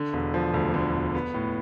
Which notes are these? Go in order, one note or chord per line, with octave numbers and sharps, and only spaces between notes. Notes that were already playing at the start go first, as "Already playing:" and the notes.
Already playing: D3
E1
F3
D2
D3
E1
B3
A2